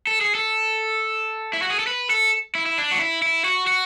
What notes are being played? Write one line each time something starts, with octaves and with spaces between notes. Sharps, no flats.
A4
G#4
A4
E4
F#4
G#4
A4
B4
A4
E4
E4
D4
F#4
E4
E4
F#4
F#4